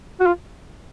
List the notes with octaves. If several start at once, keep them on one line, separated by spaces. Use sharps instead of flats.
F#4
F4